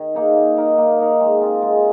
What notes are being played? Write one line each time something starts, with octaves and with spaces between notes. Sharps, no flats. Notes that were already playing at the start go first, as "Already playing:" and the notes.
Already playing: D#3
A#3 D#4 G#4
A#3
D#4 A#4 D#5
A#3
D#4 A#4 D#5
G#3
C4 F4
G#3